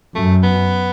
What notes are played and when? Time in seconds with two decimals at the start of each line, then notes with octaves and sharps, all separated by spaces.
0.15 F#2 A3
0.43 B3